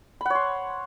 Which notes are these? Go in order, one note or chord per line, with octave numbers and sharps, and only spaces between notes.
C#5 F#5 B5 C6